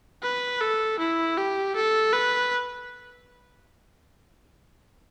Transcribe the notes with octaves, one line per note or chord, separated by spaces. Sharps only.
B4
A4
E4
G4
A4
B4